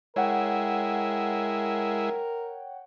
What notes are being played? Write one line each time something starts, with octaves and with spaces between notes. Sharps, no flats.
G#3 E4 A#4 C#5 F#5 G5